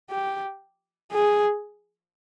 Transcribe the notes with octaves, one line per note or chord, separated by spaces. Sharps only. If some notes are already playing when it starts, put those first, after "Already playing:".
G4
G#4